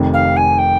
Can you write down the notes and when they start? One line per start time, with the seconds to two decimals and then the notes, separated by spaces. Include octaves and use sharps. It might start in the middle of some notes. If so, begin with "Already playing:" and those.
Already playing: F1 F2 C3 D#3
0.13 F5
0.36 G#5
0.58 G5